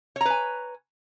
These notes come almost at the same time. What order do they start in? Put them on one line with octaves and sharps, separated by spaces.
C#5 A#5 B4 G#5